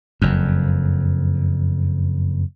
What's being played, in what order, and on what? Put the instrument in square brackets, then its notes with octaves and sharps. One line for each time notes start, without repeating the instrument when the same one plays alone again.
[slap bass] F#1 F2